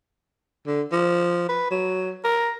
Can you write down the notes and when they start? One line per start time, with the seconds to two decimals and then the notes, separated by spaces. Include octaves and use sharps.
0.67 D3
0.92 F3
1.49 B4
1.71 F#3
2.24 A#4